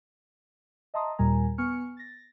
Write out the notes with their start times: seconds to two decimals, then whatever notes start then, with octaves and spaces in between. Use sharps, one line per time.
0.94 D#5 E5 A5 A#5 C6 D#6
1.19 D#2 A#2 G3 A#4 G#5 A#5
1.58 B3 G#5 C#6 F6 C#7
1.97 A6 A#6